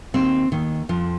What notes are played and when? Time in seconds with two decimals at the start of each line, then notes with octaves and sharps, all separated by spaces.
0.14 D#2 D#3 C4
0.52 D#2 D#3
0.89 F2 F3